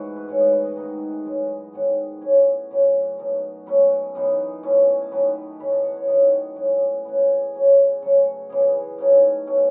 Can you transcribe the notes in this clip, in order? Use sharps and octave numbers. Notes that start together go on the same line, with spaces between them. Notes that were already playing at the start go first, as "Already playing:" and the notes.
Already playing: G#2 E3 A3 E4 F#4
B4
G#2 E3 A3 C#4 C#5
D#5
B4
D#5
G#2 D#3 A3 D#4
F#2 E3 G#3 D#4
G#2 D#3 F#3 B3 F#5
A2 F#3 C#4 G#5
F#2 C#3 F#3
B2 F#3 A3 D#4
B2 F#3 A3 C#4 B5
F#2 E3 B3 D#4
F#2 E3 A3 C#4
G#5
A5
D#3 F#3 B3 D#4 B5
F#2 E3 A3 B5
A5
F#5
C#5
D#3 F#3 B3 D#5
A2 F#3 C#4
C#3 E3 B3 B4
C#3 F#3 C#4
C#3 F#3 A3 A4
C#3 E3 B3 G#4
C#3 F#3 A3 D#4
B2 A3 C#4